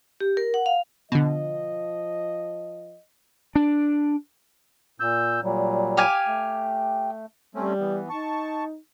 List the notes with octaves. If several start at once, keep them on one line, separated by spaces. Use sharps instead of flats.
G4
A#4
F#5
F5
B2 D3 F3 D#5
D4
A#2 E6 G6
A#2 F#3 G3
G4 F5 G#5
A3
G3 A3 C4 C#4
E3 B3
D#4 A5 C#6